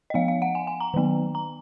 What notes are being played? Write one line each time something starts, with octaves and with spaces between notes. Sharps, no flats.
D#5
F3 B3 F5
F5
F#5
G#5
G#5
A#5
D#3 F#3 B3
A#5